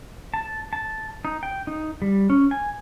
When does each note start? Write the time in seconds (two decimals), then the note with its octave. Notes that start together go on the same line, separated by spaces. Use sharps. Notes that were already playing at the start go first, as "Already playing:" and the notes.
0.34 A5
0.73 A5
1.25 D#4
1.43 G5
1.67 D#4
2.02 G3
2.30 C#4
2.51 G#5